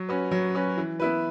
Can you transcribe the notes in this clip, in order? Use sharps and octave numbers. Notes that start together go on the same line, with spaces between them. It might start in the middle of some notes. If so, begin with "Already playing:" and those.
Already playing: F#3
C#4 F#4 B4
F#3
C#4 F#4 B4
E3
B3 E4 B4